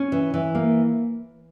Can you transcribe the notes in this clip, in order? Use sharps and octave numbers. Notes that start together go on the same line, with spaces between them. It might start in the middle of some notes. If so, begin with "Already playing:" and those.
Already playing: C#4
E3
E3
A#3